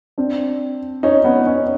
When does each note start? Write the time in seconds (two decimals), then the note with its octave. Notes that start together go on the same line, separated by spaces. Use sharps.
0.18 C4 D4
1.03 C#4 D#4
1.25 B3 C#4
1.47 C#4 D#4